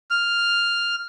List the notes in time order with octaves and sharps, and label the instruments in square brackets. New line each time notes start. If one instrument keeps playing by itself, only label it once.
[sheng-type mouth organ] F6